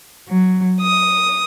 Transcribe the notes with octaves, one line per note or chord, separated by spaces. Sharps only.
F#3
D#6